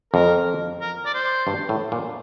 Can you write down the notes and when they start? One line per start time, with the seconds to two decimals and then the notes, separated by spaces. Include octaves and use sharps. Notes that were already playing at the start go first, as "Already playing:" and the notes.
0.13 F2 A#4
0.81 A#4
1.06 D5
1.14 C5
1.47 G2
1.69 A2
1.92 A#2